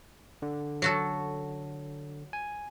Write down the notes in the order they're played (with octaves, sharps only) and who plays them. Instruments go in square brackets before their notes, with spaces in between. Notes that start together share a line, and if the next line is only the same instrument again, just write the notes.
[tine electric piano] D3
[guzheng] F#3 F#4 A4
[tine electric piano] G#5